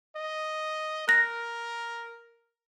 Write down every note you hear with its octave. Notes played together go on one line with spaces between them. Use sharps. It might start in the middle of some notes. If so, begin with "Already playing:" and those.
D#5
A#4 F#6 A#6